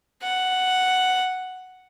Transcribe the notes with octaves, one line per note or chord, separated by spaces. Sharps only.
F#5